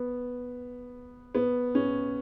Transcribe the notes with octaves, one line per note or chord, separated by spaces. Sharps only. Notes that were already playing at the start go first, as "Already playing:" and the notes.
Already playing: B3
B3
C#4